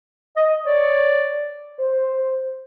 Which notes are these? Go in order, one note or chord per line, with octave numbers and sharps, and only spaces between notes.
D#5
C#5 D5
C5